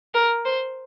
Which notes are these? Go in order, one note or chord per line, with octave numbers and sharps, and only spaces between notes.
A#4
C5